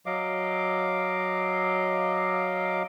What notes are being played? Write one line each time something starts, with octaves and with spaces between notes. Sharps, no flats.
F#3 D#5 F5 D6